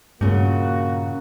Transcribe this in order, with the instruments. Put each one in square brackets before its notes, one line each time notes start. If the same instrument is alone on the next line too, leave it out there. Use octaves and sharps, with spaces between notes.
[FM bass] G2 [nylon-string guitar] A#2 C#3 [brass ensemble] A#3 F#4